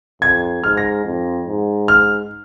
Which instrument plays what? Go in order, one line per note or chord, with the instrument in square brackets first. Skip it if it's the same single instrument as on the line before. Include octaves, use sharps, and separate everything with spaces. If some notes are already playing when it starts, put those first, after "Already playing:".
[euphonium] F2 [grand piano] G#6
[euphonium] G#2 [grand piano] F6
[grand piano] A#6
[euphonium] F2
G#2
[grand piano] F6